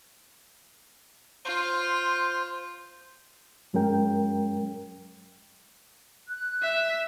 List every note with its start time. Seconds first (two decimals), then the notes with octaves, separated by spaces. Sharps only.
1.45 F4 C5
3.73 G2 F#3 G#3 C#4 A#4 G5
6.28 F#6
6.62 E5